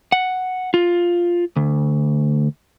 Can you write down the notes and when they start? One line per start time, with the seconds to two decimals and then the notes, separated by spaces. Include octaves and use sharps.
0.12 F#5
0.74 F4
1.56 D2